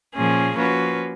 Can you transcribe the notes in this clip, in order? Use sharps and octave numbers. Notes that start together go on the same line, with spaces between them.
A#2 F3 A#3 C#4 G#4
F3 A#3 C#4 F#4 B4